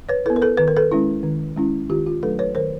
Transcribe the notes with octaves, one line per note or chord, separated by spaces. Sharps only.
B4 C#5
B3 E4 A4 B4
A#4
A4 B4
D#3 B4
A#4
A4 B4
G#3 C#4 E4
D#3
G#3 C#4 E4
D#3 F4 G4
F4
F#3 A3 D4 A4 B4
B4 C#5
D#3 A#4 C5